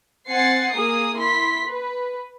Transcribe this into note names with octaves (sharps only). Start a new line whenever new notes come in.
C4 F#5 G#5 A6 C7 C#7
A#3 G#4 D#6
E4 C6 B6
B4